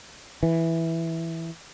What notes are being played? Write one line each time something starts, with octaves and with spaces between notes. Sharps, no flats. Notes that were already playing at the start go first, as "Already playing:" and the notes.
E3